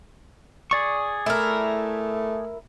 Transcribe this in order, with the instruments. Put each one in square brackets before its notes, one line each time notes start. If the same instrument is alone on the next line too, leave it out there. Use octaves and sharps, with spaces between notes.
[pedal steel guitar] G#4 D5 C#6
[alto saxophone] A3 [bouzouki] E4 A#4